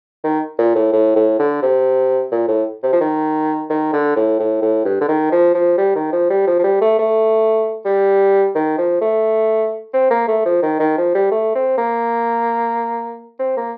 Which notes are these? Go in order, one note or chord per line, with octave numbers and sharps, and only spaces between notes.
D#3
A#2
A2
A2
A2
D3
C3
A#2
A2
C3
F3
D#3
D#3
D3
A2
A2
A2
G2
D3
D#3
F3
F3
G3
D#3
F3
G3
F3
F3
G3
A3
A3
G3
D#3
F3
A3
C4
A#3
A3
F3
D#3
D#3
F3
G3
A3
C4
A#3
C4
A#3